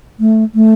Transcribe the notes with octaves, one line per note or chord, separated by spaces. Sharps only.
A3
A3